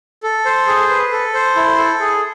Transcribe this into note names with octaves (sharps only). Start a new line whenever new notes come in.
A4
C5
G#4
B4
A4
C5
E4
A4
G#4